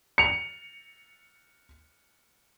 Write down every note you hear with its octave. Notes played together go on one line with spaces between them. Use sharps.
C#7 F7